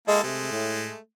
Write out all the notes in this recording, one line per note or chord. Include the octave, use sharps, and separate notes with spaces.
G#3 A#3 E4 A4
C3 G#3 A3
A2